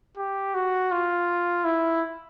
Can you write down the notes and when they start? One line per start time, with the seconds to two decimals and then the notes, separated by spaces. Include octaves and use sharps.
0.17 G4
0.55 F#4
0.92 F4
1.65 E4